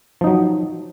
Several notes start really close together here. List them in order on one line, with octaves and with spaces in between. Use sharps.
F3 D#4 F#3